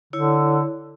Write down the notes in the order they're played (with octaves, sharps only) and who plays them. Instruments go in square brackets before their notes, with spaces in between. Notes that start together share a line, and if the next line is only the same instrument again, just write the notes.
[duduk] D3 [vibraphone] E4 C#5